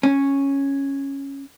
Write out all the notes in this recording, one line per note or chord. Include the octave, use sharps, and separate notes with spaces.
C#4